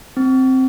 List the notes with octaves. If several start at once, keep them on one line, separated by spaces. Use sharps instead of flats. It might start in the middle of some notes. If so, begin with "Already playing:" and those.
C4